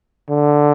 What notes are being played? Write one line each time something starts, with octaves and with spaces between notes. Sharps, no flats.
D3